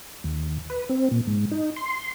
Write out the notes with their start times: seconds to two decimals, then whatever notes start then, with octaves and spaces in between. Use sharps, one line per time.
0.24 D#2
0.70 B4
0.89 C4
1.11 A#2
1.27 G#2
1.51 D#4
1.76 C6